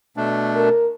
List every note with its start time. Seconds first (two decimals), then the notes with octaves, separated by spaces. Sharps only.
0.17 B2 A3 D4
0.55 A#4